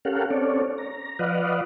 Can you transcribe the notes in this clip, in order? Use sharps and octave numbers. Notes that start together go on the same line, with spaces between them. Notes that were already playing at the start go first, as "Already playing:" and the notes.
C#4 G4 A4 A#4 F5 F#5
C4 C#4 A4 C#5 D5
A#5
F3 B4 D5 D#5 F5 F#5